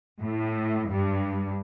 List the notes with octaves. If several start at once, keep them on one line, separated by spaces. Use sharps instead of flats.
A2
G2